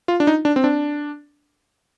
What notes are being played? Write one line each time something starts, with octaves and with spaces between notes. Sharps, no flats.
F4
D4
D#4
D4
C4
D4